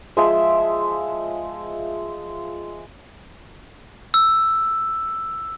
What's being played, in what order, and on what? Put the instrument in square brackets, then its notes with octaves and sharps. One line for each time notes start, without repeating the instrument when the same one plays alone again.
[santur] F3 G#3 E5
[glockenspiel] E6